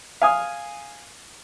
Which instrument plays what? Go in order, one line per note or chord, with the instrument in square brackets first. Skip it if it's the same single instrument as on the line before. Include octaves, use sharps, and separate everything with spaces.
[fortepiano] F5 G#5 D#6